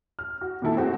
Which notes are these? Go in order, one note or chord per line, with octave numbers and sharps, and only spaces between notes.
F6
F#4
A#2 D#3 E4 A4
A3 C4 F#4 G#4